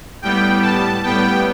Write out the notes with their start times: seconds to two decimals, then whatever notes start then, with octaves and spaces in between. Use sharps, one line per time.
0.22 A2 G3 B3 G5
0.62 A5
1.04 A2 G3 B3 G5